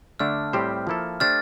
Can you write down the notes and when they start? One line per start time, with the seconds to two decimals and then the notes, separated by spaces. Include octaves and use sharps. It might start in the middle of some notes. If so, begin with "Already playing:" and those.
0.19 D3 A3 D4 F6
0.53 A2 G3 C4 G4 C5
0.87 F3 A#3 E4 A4
1.20 A3 D4 G4 C5 F6 A6